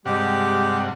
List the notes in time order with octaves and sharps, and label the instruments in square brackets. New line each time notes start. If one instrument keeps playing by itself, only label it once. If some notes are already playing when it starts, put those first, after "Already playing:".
[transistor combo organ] G2 C3 F#5 [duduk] G#3 [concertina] G4